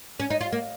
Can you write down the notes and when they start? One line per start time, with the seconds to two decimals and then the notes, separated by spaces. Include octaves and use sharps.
0.20 C#4
0.30 D#4
0.41 F4
0.52 A#3